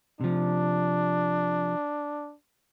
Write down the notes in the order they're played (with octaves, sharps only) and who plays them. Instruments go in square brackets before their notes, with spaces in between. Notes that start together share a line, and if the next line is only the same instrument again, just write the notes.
[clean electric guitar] C3 F3 [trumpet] D4